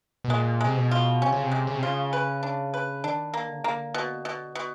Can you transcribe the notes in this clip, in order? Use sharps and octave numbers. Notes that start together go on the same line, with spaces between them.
B2
A#2 G#3
C3 G#3
B2
F4
C3 C#4
C#3
C3
G#3
C#3
C3
C#3 F4
B4
D4
B4
D#3 D4
A#3
D3
C#3
D3 A#3
B2
B2
B2